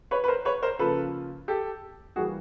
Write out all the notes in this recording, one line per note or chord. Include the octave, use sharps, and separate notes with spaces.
B4 C#5
B4
A#4 C5
B4 C#5
A#4 C5
C#3 F3 A#3 A4 B4
G4 A4
E3 G3 A#3 F#4 G#4